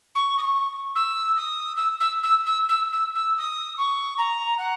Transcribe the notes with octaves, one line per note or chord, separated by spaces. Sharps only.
C#6
D#6
C#6
E6
D#6
E6
E6
E6
E6
E6
E6
E6
D#6
C#6
A#5
F#5